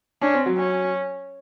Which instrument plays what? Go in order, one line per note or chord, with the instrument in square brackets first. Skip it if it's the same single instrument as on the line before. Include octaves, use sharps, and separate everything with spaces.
[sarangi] C#4 [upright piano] D4
[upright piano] C4
F#3
[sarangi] C#4